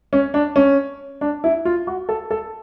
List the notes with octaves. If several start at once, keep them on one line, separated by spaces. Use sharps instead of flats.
C#4
D4
C#4
D4
E4
F4
F#4
A4
A4